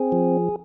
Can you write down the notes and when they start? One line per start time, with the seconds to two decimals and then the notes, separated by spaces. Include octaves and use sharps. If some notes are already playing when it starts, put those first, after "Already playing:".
Already playing: C4 G#4
0.12 F3